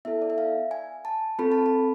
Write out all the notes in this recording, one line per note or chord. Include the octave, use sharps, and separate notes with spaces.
B3 E4 A4 E5
D5
E5
F5
G#5
A5
C4 F4 A4 B5
A5
B5